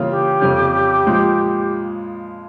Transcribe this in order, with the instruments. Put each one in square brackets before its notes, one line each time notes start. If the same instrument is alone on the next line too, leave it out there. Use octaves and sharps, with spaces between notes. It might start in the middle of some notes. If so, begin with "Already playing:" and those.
Already playing: [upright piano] C#3 E3 G3 A#3 F4
[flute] G4
[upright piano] F2 C#3 G3 C#4
A#2 F3 G#3